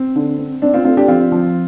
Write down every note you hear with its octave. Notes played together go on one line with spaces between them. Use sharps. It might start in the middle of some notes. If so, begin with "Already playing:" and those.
Already playing: C4
D3
C4
C4 D4
C4 F4
A3 C4 F4
D4 G4
F3 C4 F4
F3